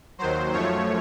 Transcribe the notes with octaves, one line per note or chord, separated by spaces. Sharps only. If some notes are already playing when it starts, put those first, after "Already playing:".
D#2 D#3 F#3 C5
F#2 F3 A3 C#5